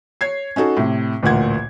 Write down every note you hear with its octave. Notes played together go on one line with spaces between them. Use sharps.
C#5 G#6 C7
C#4 D#4 F#4 A4
A2 C3
A1 D2 A#2 F#5 G#6